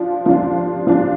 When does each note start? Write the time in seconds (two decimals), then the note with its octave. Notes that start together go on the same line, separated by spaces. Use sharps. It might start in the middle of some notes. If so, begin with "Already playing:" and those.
Already playing: F3 D4 F4
0.26 F3 D4 F4
0.87 F3 D4 F4